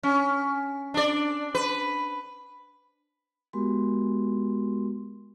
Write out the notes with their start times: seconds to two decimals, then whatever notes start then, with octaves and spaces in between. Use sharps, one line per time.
0.03 C#4
0.94 D4 D5
1.55 B4
3.53 G#3 B3 F#4 G4 A#4 C6